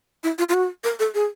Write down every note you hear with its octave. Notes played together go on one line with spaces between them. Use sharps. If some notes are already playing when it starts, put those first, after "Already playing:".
E4
F4
F4
F#4
A#4
A4
G#4